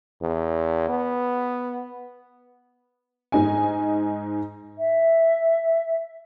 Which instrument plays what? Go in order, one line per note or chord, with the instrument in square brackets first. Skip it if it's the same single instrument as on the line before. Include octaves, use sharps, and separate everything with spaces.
[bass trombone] E2
B3
[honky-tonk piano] G#2 D#4 G#5
[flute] E5